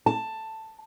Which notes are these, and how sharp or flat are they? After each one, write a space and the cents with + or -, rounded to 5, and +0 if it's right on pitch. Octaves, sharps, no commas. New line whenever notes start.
A5 +10